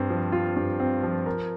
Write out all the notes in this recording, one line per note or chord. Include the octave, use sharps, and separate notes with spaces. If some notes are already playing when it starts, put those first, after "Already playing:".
Already playing: G2 C4
F3
F4
G2
C4
F3
A#4